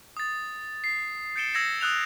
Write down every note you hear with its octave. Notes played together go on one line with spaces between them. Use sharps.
D#6 A6
C7
G6 A6 C#7 D7 E7 G7
E6 G#6 A#6 C#7 E7
D#6 E6 F#6 G6 F7